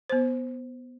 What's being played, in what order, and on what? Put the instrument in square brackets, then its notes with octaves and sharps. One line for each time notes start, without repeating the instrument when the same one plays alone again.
[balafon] B3 C5